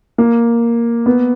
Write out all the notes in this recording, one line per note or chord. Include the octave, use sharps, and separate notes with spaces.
A#3
B3